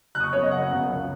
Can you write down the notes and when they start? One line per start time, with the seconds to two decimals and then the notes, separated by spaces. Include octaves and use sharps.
0.15 F#1 F#6
0.20 D#6
0.23 C#6
0.33 F#2 C#3 B3 C#5
0.42 D#5
0.51 F#1 F#5
0.70 F#2 C#3 B3
0.88 C#2